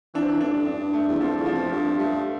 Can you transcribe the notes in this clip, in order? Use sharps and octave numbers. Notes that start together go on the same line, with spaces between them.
E3 D4
F3
E3
A2 D4
G2
D4
A3
E2
F2 F3
E2
F3
F2
G2 F3
G2 A3